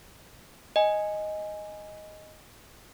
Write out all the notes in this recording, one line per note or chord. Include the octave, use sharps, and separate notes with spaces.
D#5 G#5